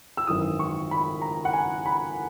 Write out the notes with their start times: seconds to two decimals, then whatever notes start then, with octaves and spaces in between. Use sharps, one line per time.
0.17 E6
0.27 G#1 F#2 E3 D#6
0.59 C#6
0.91 B5
1.22 A#5
1.45 F#5
1.53 G#5
1.86 B5